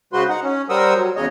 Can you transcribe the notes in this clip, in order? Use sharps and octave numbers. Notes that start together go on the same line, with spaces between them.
C#3 G#3 F#4 B4 C5 C6
D#4 F#5
C#4
G3 A#4 C5 F#5 D#6 E6
F#3
E2 C#3 G#3 C#5 D#5